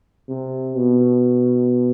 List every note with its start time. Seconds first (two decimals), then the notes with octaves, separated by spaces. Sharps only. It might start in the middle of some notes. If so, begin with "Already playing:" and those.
0.29 C3
0.75 B2